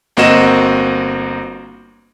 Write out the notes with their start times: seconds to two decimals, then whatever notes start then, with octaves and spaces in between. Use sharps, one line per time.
0.17 G1 A#3 C4 F#4 D#5 E7